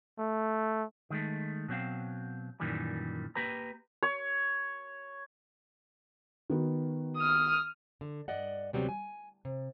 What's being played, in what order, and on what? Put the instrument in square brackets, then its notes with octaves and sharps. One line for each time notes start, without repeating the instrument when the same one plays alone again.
[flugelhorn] A3
[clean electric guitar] D#3 G#3 A3
B2 F#3 C4 F5
F#2 A#2 D#3 E3 G3
A#3 G4 B4 A#5
[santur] C#5
[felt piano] D#3 B3 F#4
[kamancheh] D#6 F6
[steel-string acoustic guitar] D3
G2 D5 D#5 F#5
D2 C3 F#3 G3 B3
G#5
C3